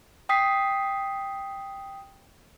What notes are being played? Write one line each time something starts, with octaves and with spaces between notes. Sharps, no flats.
G5 D#6 B6 C7